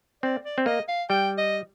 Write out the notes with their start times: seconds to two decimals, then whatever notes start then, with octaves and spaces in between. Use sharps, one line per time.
0.23 C4 D5
0.45 D5
0.58 C4
0.66 A#3 D#5
0.88 F5
1.10 G3 G5
1.38 D#5